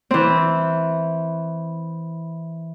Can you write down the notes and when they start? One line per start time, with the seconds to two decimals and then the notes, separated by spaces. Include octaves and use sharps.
0.11 E3 C4